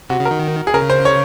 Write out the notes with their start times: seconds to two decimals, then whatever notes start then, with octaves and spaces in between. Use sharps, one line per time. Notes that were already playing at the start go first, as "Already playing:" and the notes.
0.10 C3 F#4
0.20 C#3
0.26 A#4
0.31 D#3
0.67 G#4
0.74 C#3 A#4
0.90 C5
1.05 C#5